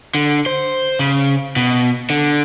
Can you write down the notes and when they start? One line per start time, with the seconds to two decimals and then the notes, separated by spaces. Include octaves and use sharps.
0.15 D3
0.46 C5
0.99 C#3
1.56 B2
2.10 D3